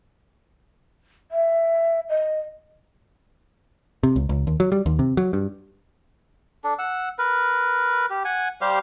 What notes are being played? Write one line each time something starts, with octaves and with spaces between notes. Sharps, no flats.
E5
D#5
C3
C#2
C#2
D#2
F#3
G3
D#2
C3
F#3
G2
D4 A4
F#5 E6
A#4 B4
G4
F#5 G#5
G3 G4 C5 F5